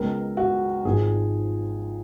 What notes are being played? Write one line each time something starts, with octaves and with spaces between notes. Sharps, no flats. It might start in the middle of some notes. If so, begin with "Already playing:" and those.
Already playing: C#2 C#3 G#3 B3 A#4
F#4
G#1 G#2 F3 G#4